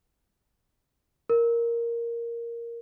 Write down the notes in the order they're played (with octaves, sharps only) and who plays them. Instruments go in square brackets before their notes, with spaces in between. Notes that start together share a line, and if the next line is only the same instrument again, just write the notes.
[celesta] A#4